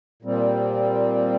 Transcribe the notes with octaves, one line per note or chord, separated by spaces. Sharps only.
A#2 G3 C4